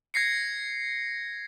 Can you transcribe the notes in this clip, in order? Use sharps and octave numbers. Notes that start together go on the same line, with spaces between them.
G#6 A#6 C7 C#7